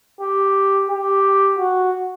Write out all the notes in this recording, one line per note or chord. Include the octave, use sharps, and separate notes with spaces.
G4
G4
F#4